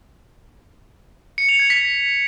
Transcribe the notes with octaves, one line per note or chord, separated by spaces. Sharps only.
C#7
F7
G#6
B6